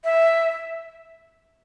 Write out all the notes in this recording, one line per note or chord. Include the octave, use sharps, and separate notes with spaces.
E5